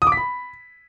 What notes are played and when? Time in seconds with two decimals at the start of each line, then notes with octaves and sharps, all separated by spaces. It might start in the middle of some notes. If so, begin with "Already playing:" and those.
0.02 D#6
0.07 D6
0.12 B6
0.17 B5